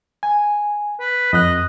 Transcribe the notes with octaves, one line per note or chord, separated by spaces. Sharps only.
G#5
B4
F2 D#5 F#6